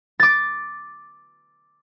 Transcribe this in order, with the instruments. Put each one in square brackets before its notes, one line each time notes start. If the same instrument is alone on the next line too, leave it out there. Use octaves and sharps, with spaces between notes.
[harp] D6 A6